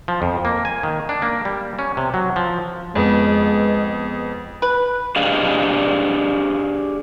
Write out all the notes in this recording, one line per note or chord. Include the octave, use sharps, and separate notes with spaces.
F3
F2
A#3
G#5
D#3
D4
A#3
G3
C#4
C3
F#3
F3
F2 G#3 B3
B4
D4 G4 G#4 D5 D#5 F5